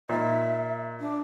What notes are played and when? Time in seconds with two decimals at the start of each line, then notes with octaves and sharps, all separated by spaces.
0.09 A#2 D#4 E5
0.99 D4